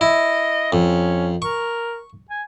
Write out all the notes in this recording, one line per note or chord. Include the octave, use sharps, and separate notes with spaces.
E4 D#5
F2 C#4
A#4 C#6
G#5